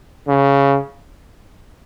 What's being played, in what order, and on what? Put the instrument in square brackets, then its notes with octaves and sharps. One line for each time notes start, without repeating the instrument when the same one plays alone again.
[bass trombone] C#3